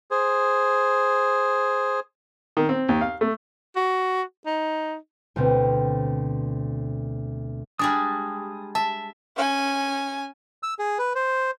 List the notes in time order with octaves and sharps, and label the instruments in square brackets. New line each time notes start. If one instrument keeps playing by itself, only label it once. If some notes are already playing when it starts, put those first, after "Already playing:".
[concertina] G#4 C5
[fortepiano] D#3
C4
D#2
F5
A3
[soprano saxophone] F#4
D#4
[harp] D2 B2 C4
[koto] G3 G#3 D4 [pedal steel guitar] D#6
[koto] E5 [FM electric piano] A5
[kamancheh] C#4 G#5
[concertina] E6
G#4
B4
C5